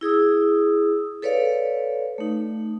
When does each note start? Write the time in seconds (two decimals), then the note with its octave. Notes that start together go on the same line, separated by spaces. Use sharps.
0.01 E4 G#4 D#6 E6
1.22 A4 B4 C#5 D5 F5
2.18 A3 D#4